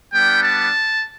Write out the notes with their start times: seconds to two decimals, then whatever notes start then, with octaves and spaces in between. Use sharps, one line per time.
0.13 G3 B3 D4 G5
0.43 A5